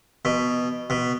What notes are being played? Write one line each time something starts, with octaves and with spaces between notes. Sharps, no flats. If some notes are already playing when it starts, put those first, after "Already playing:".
B2
B2